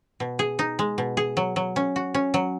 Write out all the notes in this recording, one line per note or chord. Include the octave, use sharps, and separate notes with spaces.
B2
G#4
D#4
G#3
B2
G#4
F#3
F#3
C#4
F#4
C#4
F#3